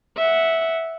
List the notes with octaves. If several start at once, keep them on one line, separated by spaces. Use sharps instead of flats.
E5 F#5